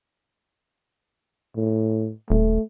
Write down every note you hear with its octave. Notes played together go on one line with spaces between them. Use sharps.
A2
D#1 A3